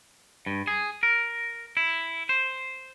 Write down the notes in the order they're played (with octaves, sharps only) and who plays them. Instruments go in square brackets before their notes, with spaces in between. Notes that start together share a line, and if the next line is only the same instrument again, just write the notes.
[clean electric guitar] G2
G#4
A#4
E4
C5